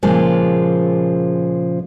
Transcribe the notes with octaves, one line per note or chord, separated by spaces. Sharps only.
A#2 C#3 F3 G#3